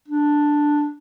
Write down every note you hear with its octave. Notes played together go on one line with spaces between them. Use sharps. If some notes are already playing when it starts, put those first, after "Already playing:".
D4